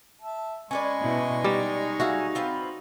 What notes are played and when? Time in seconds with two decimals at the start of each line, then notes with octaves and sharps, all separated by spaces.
0.22 E5 A5
0.71 G#3 C#4 B4 D5 D#5 C#6
1.02 B2 E4
1.44 G3 D#4
2.00 F#4 G#4 E5 F5
2.35 C4 F4 B4